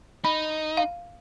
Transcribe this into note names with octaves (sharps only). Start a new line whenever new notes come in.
D#4 B5
F5